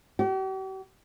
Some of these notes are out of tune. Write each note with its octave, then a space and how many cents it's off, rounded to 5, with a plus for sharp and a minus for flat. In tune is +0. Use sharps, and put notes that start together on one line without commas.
G4 -45